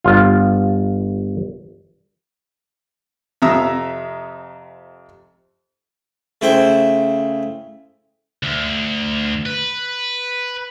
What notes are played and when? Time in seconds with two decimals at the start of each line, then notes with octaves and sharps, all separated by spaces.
0.05 G1 F4
3.42 F2 C3 E5 A#5 D#6 E6
6.41 C#3 A3 E4 C5 G5
8.43 D2
9.46 B4